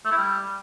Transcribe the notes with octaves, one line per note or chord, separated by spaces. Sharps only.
A3
E4
G3